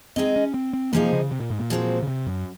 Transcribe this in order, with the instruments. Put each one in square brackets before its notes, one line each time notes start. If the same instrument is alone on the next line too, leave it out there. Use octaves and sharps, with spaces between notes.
[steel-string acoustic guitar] G#3 D#4 G#4 D#5 [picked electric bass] C4
[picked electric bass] C#4
C4
C4
[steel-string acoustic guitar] C3 F3 G#3 D#4 G#4 [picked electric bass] A#3
[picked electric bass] C#3
C3
A#2
G#2
A#2
[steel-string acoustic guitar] F3 G#3 C4 F#4
[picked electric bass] C#3
C3
F#2